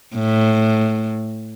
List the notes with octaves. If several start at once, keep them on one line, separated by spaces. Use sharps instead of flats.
A2